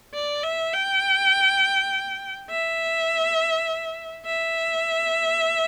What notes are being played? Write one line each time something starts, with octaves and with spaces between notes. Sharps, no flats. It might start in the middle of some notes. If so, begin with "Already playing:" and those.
D5
E5
G5
E5
E5